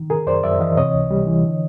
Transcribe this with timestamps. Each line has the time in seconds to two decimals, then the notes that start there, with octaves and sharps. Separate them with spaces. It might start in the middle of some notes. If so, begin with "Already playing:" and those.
Already playing: D#3
0.10 C#3 G#4 A#4
0.26 F#2 C5 D5
0.43 F#2 D5 E5
0.60 E3 D#5 F5
0.77 C3 C#5 D#5
0.93 C#2
1.11 G3
1.27 E3
1.43 D3